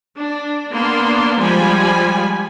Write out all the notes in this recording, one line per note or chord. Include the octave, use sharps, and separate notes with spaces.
D4
A#3 B3 D4 C6
F3 G3 G#3 G#5 B5